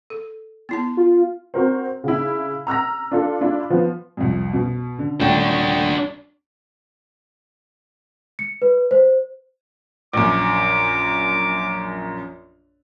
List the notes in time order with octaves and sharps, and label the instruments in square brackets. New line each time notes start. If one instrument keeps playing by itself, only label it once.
[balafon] A4
B3 E4 A5
[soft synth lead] F4
[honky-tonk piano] C4 F#4 A#4 C5
C#3 E4
A#5 E6 F6 A#6
D4 F4 A4
D4 E4 F4
F3 B3
[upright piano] C2 F2
B2
D3
[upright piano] D#1 A3 G5 [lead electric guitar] D4 F#4
[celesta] C#7
B4
C5
[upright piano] A#1 F#2 [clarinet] D6